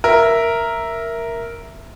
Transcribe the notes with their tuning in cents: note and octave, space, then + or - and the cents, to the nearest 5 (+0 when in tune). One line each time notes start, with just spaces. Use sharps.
A#4 +0 E5 +0